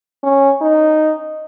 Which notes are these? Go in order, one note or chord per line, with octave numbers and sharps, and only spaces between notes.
C#4
D#4